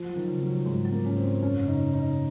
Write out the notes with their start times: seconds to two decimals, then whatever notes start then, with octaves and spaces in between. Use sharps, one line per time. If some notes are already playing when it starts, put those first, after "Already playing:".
Already playing: F3
0.09 F#3
0.16 D#3
0.28 C#3
0.41 F#3
0.47 C#3
0.66 G#2 G#3
0.85 F#3
0.92 A#3
1.04 G#2 C#4
1.17 C4
1.23 G#2
1.42 F#2 C#4
1.62 C#3
1.68 D#4
1.81 C#3
1.94 D#4
2.00 C#3